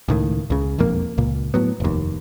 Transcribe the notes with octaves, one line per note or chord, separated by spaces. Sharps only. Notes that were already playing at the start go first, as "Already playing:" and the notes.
C#2 A2 D#3
C#2 C#3
E1 A#1 F2 A#3
C#2 A#2
A2 F#3 B3
F1 D#2